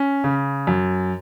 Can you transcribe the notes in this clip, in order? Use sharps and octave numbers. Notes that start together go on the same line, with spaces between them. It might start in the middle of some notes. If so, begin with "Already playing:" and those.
Already playing: C#4
C#3
F#2